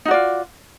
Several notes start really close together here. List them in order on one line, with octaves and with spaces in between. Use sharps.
D#4 F#4 D5 F4